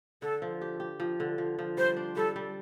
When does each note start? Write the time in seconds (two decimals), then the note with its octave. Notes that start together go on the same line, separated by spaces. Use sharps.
0.22 D3 A4
0.42 F3
0.61 G4
0.80 G4
1.00 F3
1.20 D3
1.38 F3
1.59 F3
1.77 G3 C5
1.97 D4
2.16 G3 A4
2.36 G3